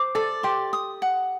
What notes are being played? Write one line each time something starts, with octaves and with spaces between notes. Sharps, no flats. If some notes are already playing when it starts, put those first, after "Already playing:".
Already playing: C5 D6
A4 D5
G4 C6
D#6
F#5